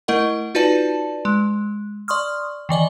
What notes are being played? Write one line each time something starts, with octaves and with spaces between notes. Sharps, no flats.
A3 E4 A#4 D#5 F#5
D#4 F4 F#4 B4 D5 A5
G#3
D5 C6 C#6 D#6 F6
D#3 E3 D5 D#5